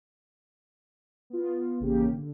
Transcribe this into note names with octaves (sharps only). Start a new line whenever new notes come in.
B3 F4
A1 C#3 A#3 G4
D3